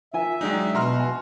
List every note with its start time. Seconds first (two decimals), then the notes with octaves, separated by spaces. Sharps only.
0.14 F4 A#4 E5 G#5
0.41 F#3 G#3 D4 D#4 D#5 G5
0.75 B2 F#4 A#5 C6 F6
1.00 G#5